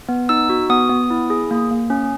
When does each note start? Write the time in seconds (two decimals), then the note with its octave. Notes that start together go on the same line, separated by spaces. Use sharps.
0.09 B3
0.29 D#4 E6
0.49 F#4
0.70 B3 D#6
0.89 B3
1.10 E4
1.30 G#4
1.51 A#3
1.71 A#3
1.90 C#4